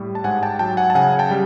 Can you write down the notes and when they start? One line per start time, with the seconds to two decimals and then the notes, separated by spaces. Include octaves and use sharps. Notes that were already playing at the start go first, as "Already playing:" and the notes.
Already playing: A2 G3
0.15 A5
0.24 G#2 F#5 G#5
0.43 G5 A5
0.59 F#3 G5 A5
0.77 F#5 G#5
0.90 A5
0.95 C#3 F#5 G#5
1.19 G5 A5
1.31 G3